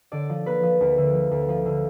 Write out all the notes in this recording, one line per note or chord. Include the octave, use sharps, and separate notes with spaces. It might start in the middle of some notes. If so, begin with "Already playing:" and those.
D3 D5
F3
A#3 B4
F3
D2
D3
F3
D2
F3
D3